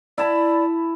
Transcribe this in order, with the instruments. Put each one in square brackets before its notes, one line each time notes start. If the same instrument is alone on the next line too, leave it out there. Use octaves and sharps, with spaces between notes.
[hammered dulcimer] E4 A5 B5 [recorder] D5